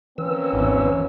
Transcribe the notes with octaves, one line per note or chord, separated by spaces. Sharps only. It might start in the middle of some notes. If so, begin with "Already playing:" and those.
E3 A#3 C4 C#4 B4 E6
G#1 E2